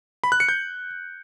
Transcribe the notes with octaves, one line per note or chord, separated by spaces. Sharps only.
B5
F#6
C#7
G6